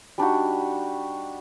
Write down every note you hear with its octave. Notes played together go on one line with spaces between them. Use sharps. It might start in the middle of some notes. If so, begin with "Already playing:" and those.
G3 D4 D#4 F#4